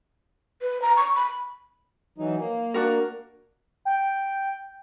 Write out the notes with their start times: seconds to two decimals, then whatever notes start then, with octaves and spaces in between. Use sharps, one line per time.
0.62 B4
0.82 A#5
0.97 C#6
1.16 B5
2.18 E3 F#3 D#4
2.38 A#3
2.74 D4 F#4 A#4
3.85 G5